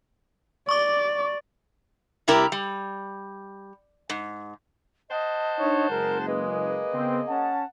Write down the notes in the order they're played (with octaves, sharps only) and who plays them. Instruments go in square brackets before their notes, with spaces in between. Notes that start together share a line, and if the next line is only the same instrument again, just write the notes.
[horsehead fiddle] D5 [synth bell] C#6 D6
[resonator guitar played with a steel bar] C3 G3 E4 G4 A#4
G3
G#2
[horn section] C5 F#5 A5 [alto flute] D#5
[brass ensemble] D4 D#4 C#5
[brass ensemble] F#1 G#3 [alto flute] A#4
[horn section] A#3 G#4 D#5 [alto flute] B4
[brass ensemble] C#3 B3 C4
[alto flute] C#4 [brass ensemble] F#5 A5